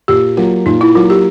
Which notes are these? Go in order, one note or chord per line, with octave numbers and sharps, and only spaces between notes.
A#2 G4
F#3 A#3 F4
A#2 D#4
E4
F#3 A#3 F4
G4